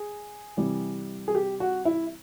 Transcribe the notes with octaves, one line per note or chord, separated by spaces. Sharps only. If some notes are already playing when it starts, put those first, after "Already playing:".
Already playing: G#4
C3 E3 G3
G#4
G4
F#4
E4